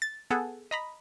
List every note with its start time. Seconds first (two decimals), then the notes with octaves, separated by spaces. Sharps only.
0.02 A6
0.30 B3 G#4 A4 F#5
0.71 D#5 A#5 B5